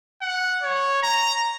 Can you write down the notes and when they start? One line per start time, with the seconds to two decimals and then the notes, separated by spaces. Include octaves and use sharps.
0.22 F#5
0.63 C#5
1.02 A#5